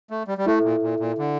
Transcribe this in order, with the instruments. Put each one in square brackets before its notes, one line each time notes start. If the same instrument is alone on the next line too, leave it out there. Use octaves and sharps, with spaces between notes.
[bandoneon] A3
G3
G3
[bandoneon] A3 [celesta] E4 A4 E5
[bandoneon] A#2
A#2
A#2
D3